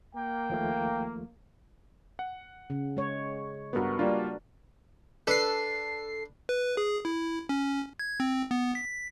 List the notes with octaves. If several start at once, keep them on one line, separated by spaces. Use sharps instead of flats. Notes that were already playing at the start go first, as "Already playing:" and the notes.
A#3 G5
D#2 F3 A3
F#5
C#3
G#3 C#5
G2 B3 F#4 A#4 B4
G3 A#3 D4 F4
D4 A4 B4 C7
B4
G#4
E4
C#4
G#6
C4
B3
B6